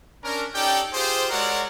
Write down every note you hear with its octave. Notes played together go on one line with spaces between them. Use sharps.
C#4 D4 A#4
C#4 D#4 G4 A4 D5 G5
F4 G4 G#4 C5
G#3 F#4 A#4 C#5 D5 F#5